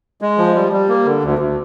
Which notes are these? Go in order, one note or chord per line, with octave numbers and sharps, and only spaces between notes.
G#3
F3
G3
G3
A#3
D3
D2
D2